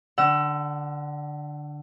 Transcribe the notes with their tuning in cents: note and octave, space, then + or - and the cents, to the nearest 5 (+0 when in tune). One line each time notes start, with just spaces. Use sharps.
D3 +0 F#5 +30 E6 +20